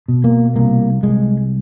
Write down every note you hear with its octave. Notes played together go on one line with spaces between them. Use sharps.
B2
A#3
C2 A#3
C2 G#3